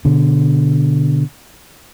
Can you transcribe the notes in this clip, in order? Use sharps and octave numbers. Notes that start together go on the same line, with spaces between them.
B2 D3